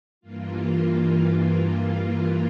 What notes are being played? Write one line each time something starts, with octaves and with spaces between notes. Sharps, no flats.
G2 E3 A#3 F4